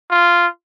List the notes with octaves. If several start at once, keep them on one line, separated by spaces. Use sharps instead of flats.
F4